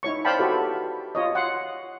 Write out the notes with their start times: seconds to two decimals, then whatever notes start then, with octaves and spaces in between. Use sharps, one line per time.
0.03 D#4 E4 C#5 C#6
0.25 C5 D5 F5 G5 A5 B5
0.39 E4 F#4 G4 A4 B4
1.15 F4 C#5 D#5
1.35 F#5 C6